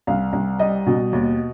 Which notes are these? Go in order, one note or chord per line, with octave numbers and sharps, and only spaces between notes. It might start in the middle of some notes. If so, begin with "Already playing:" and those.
C2 F5
C2
G3 D#5
B2
D#2